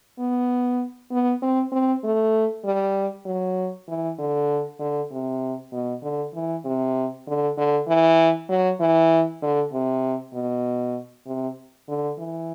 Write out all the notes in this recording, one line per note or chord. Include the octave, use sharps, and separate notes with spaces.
B3
B3
C4
C4
A3
G3
F#3
E3
D3
D3
C3
B2
D3
E3
C3
D3
D3
E3
F#3
E3
D3
C3
B2
C3
D3
E3